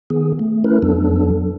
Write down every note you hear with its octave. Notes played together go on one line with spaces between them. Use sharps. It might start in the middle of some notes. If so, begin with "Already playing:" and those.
D#3 B3 G#4
A3
A3 C#4 E4 A#4 B4
F2 F#3 B3 D4 A4